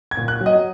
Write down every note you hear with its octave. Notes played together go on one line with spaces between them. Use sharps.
G#6
A#2
F#6
F#3
D#5